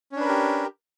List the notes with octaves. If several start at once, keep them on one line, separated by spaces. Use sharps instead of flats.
C#4 D4 G4 A#4 B4